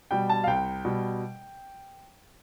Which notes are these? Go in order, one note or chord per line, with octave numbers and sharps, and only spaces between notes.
B2 G3 G5
A5
F5
C2 G5
B2 G3